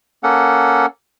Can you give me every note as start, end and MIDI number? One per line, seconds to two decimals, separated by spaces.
0.23 0.86 58
0.23 0.86 61
0.23 0.86 69
0.23 0.86 78